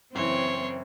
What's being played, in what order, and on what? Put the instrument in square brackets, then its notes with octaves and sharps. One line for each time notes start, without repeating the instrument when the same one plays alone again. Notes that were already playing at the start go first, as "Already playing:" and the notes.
[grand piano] F#1 E3 [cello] C4 [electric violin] C#5 C6